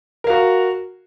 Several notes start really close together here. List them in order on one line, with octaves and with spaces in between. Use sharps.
A#4 F5 F#4